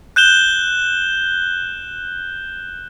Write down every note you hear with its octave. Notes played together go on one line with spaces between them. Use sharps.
F#6 G6 E7 G7